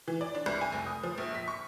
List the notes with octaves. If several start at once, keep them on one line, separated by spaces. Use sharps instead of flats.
E3
D5
D4
C2
G#5
F1
D#6
F3
A#1
B6
C#6